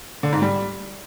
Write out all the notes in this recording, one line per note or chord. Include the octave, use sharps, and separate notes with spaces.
D3
G#2
G3